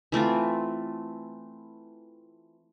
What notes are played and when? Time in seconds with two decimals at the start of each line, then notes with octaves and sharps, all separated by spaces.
0.12 E3 A3 C4 F4